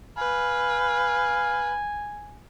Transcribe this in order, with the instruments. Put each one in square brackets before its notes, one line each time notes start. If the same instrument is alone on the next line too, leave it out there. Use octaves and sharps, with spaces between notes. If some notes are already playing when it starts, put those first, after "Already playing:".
[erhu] B4 [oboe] F5 [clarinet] G#5